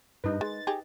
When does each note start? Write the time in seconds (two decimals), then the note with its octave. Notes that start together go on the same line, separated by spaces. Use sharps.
0.24 G2 D#4 B4
0.41 G#3 A6
0.67 D#4 G4 G#4